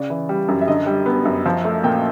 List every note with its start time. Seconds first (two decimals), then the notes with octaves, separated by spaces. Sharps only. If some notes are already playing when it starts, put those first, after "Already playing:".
Already playing: C#3 D5
0.10 E3
0.29 G3
0.48 F#2
0.61 E5
0.68 D3 D#5
0.86 G3
1.06 B3
1.25 F#2
1.45 F3
1.65 A3
1.84 A#2 G5